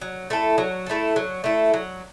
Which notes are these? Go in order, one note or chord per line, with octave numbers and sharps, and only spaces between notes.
F#3
A3 E4 A4
F#3
A3 E4 A4
F#3
A3 E4 A4
F#3